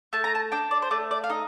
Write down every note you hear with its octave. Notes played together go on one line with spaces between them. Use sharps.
A3 A5
A#5
A5
D4 G5
D5
C5
A3 D5
D5
F5
D#4 D#5